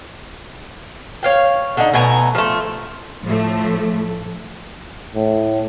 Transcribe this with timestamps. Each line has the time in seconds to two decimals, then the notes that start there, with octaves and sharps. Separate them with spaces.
1.23 C#5 F5 G5
1.77 D3 D#4
1.93 B2 A3 G#5 A#5
2.35 F3 A3
3.24 A2 F3 A3
5.15 A2